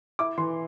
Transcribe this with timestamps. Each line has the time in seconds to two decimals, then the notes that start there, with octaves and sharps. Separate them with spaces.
0.19 E4 D6
0.38 E3 C6